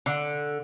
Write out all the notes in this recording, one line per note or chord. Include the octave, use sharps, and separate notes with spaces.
D3